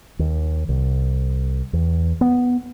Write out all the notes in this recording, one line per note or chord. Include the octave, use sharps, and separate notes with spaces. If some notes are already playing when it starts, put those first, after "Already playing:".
D#2
C2
E2
B3